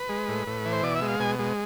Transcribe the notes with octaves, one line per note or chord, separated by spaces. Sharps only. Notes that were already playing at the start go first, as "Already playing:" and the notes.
Already playing: B4
G#3
A2
A2
E3
C5
B2 D5
E5
G#3
F5
B2 G#5
G#3